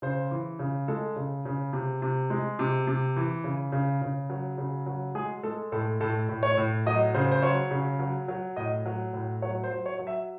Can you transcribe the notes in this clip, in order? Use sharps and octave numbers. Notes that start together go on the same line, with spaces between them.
C#3 C5
E3
C#3
G#3 A4
C#3
C#3
C3
C3
G#3
C3
C3
E3
C#3
C#3
C#3
F#3
C#3
F#3
G#3 G#4
G#3 A4
A2 A4
A2 A4
A2
C#5
A2
F#3 D#5
C#3 C5
C5
F#3 C#5
C#3
F#3
F#3
A2 D#5
F#3
A2
F#3 C#5
C5
F#3
C#5
F#3
E5